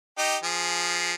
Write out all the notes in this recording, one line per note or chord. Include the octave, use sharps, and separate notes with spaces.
D#4 G4
F3 G#4